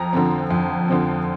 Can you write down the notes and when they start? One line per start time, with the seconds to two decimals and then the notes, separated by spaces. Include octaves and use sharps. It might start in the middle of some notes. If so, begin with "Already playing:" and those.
Already playing: F2 A#5
0.13 D3 F3 C4
0.51 F2
0.88 D3 F3 C4